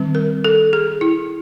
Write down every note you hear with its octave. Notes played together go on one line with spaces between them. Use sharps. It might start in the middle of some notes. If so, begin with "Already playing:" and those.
Already playing: D#3 G3 C4
A#4
A4
G#4
E4